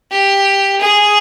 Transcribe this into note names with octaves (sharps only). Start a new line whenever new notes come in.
G4
G#4